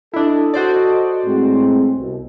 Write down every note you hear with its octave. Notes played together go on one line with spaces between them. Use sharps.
D4 E4 A4 D#5
F#4 C5 D5
A2 G#3 C4
C2 B2